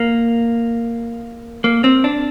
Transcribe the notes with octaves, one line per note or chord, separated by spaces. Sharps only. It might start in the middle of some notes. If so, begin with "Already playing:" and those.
Already playing: A#3
A#3
C4
D4